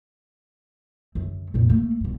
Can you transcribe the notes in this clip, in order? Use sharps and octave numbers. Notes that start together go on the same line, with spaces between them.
F#2 D3
F2 A#2
A3 A#3
B1 G2